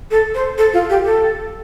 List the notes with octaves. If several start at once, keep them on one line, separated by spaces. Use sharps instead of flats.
A4
C5
A4
F4
G4
A4